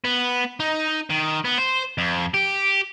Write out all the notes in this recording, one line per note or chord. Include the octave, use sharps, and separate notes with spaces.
B3
D#4
D#3
B3
C5
F2
G4